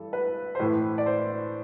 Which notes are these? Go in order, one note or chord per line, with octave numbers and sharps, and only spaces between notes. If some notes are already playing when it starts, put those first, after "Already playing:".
Already playing: G2 E3 A4
B4
C5
A2 E3 B4
D5
C5